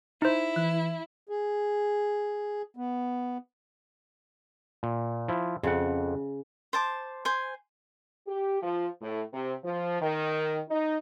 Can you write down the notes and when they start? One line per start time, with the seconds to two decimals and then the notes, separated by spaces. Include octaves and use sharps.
0.22 D#4 E4 C5
0.56 E3 F#6
1.29 G#4
2.77 B3
4.83 A#2
5.28 F3 E4
5.63 F2 C#3 F#5
6.73 C5 A5 D6
7.25 C5 G#5
8.27 G4
8.62 F3
9.01 A2
9.32 C3
9.64 F3
10.01 D#3
10.70 D#4